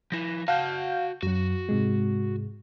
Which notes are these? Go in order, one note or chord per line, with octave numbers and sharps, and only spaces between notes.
F3 E4 A#6
F#4 F5 F#5 A5 G6
F#2 F#3 F#4
G#2 C3 G#3